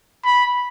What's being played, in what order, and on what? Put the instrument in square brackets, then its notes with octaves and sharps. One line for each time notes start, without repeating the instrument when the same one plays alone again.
[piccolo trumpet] B5